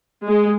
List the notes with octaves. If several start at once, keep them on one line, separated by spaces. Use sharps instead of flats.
G#3